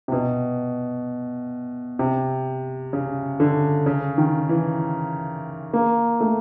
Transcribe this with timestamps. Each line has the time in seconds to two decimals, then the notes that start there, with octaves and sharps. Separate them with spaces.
0.08 C3
0.12 B2
1.99 C3
2.93 C#3
3.40 D3
3.86 C#3
4.18 D#3
4.49 E3
5.73 A#3
6.21 A3